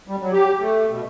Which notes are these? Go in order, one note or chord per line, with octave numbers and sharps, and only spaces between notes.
G3
F#3
G4
A3
B2